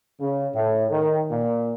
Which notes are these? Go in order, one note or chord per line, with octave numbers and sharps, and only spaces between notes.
C#3
A2
D#3
A#2